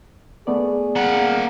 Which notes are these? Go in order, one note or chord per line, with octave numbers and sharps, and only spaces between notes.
A3 B3 G#4 D5
A#3 F#5